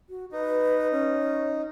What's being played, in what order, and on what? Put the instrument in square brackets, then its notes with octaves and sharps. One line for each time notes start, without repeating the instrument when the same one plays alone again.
[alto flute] F#4
[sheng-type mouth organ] D#4 [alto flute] B4
[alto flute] C#4